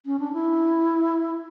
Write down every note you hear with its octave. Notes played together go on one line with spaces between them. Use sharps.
C#4
D4
E4